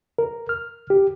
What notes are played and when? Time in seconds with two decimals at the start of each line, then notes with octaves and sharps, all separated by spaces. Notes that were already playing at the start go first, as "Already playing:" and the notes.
0.18 A#4
0.49 F6
0.90 G4